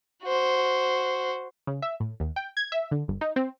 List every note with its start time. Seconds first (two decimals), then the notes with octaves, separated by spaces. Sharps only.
0.24 F#4 C5
1.67 C#3
1.82 E5
2.00 A2
2.20 D#2
2.36 G5
2.57 G#6
2.72 E5
2.91 D3
3.08 G1
3.21 D#4
3.36 C4